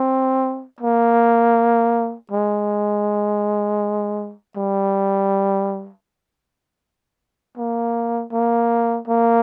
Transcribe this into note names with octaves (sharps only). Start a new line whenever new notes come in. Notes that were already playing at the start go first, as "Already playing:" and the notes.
Already playing: C4
A#3
G#3
G3
A#3
A#3
A#3